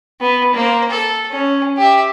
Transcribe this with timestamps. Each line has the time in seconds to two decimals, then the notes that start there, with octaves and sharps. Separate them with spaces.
0.21 B3
0.53 A#3 C5
0.89 A4
1.31 C#4
1.77 G4 E5